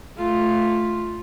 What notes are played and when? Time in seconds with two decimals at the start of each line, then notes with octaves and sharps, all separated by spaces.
0.18 A3 F4